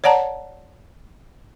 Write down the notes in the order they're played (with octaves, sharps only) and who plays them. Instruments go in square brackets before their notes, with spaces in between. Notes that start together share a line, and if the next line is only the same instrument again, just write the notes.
[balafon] C#5 D5 F#5 A5 A#5